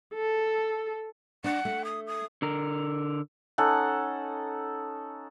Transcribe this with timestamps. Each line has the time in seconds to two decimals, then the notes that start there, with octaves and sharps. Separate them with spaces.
0.14 A4
1.44 D4 F#5
1.65 A3
1.84 D#6
2.06 D#6
2.42 D3 A#4
3.58 C#4 D#4 A4 F#5